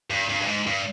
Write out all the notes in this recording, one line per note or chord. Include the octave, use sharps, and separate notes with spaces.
G2
G2
G2
G#2
G2